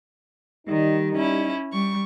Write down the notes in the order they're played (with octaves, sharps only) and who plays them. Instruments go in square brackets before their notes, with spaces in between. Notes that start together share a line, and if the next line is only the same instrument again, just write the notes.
[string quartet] D#3 [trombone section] G3 D#4
[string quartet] C#4 E4
G3 C#6